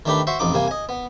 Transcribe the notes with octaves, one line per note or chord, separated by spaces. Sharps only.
D#3 A3 D4 G4 B4
F#4 C5 E5 C6 C#6
A1 F2 D#4 D6
C2 C3 A#3 G#5
D#5 G#5
B3